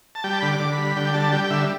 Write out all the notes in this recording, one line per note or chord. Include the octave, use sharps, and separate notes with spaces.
A5
G3 G5
A5
D3 B5
D6
D3
B5
G3
D3 G5
G3 A5
G3 G5
G5
D3 E5